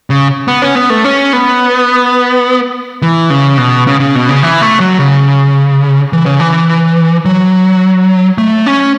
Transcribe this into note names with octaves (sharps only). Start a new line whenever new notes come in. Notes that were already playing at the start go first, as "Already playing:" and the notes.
C#3
B3
C#4
B3
A3
C#4
B3
E3
C#3
B2
C#3
C#3
B2
C#3
E3
A3
F#3
C#3
E3
C#3
E3
F#3
A3
C#4